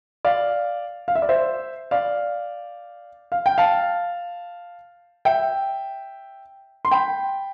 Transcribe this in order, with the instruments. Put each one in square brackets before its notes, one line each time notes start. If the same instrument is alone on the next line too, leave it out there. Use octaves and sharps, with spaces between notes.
[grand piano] D5 F5
F5
E5
D5
C5 E5
D5 F5
F5
G5
F5 A5
E5 G5
C6
G5 B5